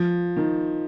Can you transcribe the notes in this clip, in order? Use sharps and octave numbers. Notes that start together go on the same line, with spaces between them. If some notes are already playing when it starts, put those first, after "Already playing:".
Already playing: F3
D#3